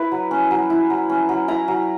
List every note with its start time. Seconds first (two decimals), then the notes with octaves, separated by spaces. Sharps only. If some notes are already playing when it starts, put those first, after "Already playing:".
Already playing: E4 B4
0.12 F#3
0.31 C#4
0.51 F#3
0.70 E4
0.90 F#3
1.10 C#4
1.29 F#3
1.48 E4 A#5
1.68 F#3